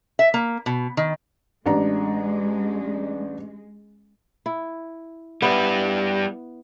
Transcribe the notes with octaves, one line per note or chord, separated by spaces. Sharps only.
E5
A#3
B2
D#3
A1 G#3 D4 A#5
E4
G3 B3 E4 B4